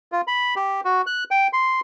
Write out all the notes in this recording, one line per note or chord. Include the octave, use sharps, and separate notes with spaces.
F4
B5
G4
F#4
F#6
G5
C6